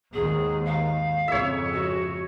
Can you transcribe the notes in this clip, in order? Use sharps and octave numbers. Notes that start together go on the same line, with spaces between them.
D#2 G#2 D#3 G#4
F5
F2 G#2 C#3 C#5 E5
F#4